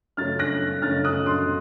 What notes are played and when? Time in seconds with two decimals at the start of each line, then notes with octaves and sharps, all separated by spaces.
0.17 F#2 C#3 A3 C#4 F6 A6
0.39 F#6 A#6
0.82 F#2 C#3 A3 C#4 F6 A6
1.04 D#6 F#6
1.26 C6 D#6